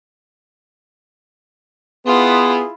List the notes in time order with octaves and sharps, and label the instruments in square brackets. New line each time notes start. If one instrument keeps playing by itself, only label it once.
[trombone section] B3 [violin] E4 F4 [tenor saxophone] G#4 [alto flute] C6